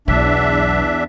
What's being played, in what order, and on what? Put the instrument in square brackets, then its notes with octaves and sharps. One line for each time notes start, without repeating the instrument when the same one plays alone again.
[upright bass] B1 F#3 [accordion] E2 D4 E5